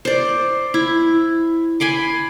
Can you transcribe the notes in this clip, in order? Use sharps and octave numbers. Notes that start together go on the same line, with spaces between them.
C5 D5
E4
G#5 B5 C6 D6